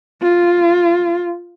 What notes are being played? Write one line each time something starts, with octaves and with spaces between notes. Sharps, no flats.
F4